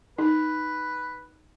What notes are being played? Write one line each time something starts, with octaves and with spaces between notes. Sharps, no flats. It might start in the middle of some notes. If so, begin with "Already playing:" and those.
D#4 B4